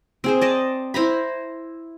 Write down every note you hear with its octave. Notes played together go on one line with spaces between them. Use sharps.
C4 G#4 C5
D5 D#5 A5
E4 C5 A#5 B5